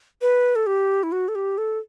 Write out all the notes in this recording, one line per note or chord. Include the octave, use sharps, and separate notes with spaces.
B4
A4
G4
E4
F#4
A4
G4
A4